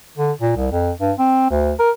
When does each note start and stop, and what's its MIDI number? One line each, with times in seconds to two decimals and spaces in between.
0.18 0.32 50
0.41 0.52 46
0.56 0.70 36
0.72 0.92 41
1.00 1.13 43
1.19 1.48 60
1.50 1.73 38
1.79 1.91 70